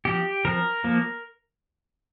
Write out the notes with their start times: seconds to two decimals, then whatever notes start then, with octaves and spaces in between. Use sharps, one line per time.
0.05 F3 C4 G4
0.45 F3 C4 A#4
0.84 F3 A#3